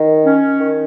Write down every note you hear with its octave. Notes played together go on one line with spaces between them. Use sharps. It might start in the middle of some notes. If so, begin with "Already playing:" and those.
Already playing: D#3
C#4
D#3